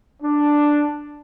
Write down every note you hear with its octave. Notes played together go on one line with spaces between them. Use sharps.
D4